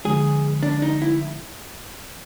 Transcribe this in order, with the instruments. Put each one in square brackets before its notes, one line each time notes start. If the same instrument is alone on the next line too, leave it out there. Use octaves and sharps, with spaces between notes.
[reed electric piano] D3 F3 G#3 [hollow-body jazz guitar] G#4
[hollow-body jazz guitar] D4
D#4
E4